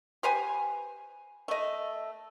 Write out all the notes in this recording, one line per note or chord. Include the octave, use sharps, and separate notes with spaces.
G4 B4 C5 G#5
A3 D#5